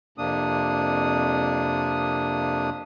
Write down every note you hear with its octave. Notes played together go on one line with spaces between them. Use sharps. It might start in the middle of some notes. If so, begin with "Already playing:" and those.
F2 C3 A#3 D4 D#6